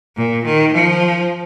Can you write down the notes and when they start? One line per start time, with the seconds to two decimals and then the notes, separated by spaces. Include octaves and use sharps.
0.17 A#2
0.45 D#3
0.73 F3